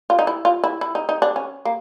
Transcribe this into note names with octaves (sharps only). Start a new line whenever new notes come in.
F4
D#4
E4
F4
E4
E4
D#4
D#4
D4
C#4
A#3